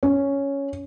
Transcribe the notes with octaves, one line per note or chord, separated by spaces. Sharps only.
C#4